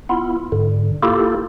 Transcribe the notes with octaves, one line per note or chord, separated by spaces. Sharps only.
B3 E4 F4
G#2 D3
A#3 E4 F4 G4 A4